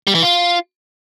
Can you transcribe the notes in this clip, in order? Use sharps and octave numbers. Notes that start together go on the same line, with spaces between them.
G3
E3
F4